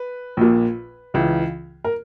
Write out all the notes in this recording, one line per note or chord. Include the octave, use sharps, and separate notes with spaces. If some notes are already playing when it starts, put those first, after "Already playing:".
Already playing: B4
A#1 A#2
C#2 C#3 E3
A#4